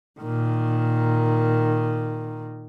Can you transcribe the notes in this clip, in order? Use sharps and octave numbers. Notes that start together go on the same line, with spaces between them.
A#2 D#3